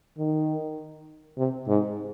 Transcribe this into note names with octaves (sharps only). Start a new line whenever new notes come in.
D#3
C3
G#2